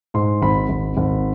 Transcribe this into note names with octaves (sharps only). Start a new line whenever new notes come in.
G#2 C6
G#1 B5
G#1
G#1